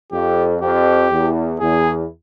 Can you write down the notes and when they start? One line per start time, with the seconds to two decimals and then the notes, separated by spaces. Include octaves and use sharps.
0.12 F2 G4
0.61 F2 G4
1.11 E2
1.60 E2 G#4